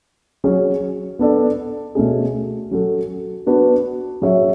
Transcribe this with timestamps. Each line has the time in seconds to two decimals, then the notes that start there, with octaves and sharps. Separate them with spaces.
0.44 F#3 C#4 G#4 C#5
1.19 B3 D4 A4 D5
1.95 B2 A3 C#4 G#4
2.71 F#3 C#4 F#4 A4
3.46 B3 D4 F#4 B4
4.22 F#3 C#4 G#4 C#5 E5